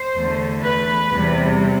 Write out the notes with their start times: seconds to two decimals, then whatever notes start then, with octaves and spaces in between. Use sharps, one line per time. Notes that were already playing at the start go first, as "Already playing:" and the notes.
Already playing: C5
0.15 E2 D3 A3
0.63 B4
1.11 E2 C3 G3